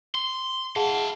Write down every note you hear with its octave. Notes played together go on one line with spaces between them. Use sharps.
C6
E4 G#4 F5 F#5 A5